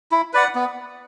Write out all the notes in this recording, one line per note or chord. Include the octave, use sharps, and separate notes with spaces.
E4
B4 D5 F#5
B3